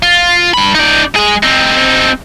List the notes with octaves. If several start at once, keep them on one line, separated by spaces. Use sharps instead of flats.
F4
G2 B5
D#4 D5
G#3 G#4
C4 D#4